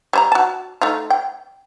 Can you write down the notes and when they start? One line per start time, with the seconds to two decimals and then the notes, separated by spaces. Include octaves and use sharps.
0.13 G3 C5 A#5
0.32 F#4 A5
0.82 A3 D#4 F4
1.10 G5